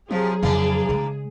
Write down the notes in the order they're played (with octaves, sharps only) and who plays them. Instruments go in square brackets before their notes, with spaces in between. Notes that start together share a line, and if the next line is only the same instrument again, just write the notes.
[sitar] C3 F3 [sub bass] F#3 [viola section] G#4
[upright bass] F2 C#3 [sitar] E3 A#3 D4
[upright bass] C#3 G#3